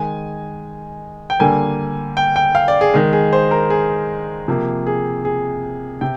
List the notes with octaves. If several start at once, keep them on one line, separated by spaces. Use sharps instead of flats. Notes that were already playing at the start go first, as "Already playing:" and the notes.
Already playing: D#3 G#3 G#5
G5
D3 G3 A#3 G#5
G5
G5
F5
D5
G#4
D#3 G#3
G#4
C5
A#4
G#4
C3 F3 A#3
G#4
G#4
C3 G5